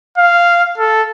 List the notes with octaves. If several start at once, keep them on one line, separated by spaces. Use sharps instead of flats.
F5
A4